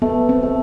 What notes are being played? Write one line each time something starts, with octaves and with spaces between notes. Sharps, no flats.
A3 B3
C4
A3